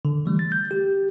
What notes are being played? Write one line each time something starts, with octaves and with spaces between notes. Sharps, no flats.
D3
E3 G3 A3
A6
G6
G4